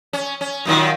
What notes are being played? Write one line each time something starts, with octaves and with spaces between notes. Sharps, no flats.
C#4
C#4
F#2 A#2 D#3